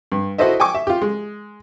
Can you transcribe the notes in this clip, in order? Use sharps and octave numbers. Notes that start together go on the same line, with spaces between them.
G2
E4 F#4 A4 C5 D#5 E5
G5 G#5 C#6 D6
E5
F4 G4
G#3